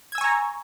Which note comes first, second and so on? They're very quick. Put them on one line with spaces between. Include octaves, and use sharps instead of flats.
G#6 E6 G#5 C#6 A#5